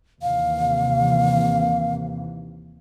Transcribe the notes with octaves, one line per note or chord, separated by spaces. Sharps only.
D#2 C3 E3 F5